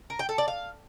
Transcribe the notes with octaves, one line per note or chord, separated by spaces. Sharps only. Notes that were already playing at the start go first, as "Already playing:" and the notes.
A#4
G5
A4
D5
F5